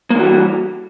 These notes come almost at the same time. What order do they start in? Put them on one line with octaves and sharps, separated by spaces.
A#3 E3 F#4 G3